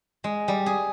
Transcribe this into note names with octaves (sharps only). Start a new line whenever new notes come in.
G#3
G3
G#4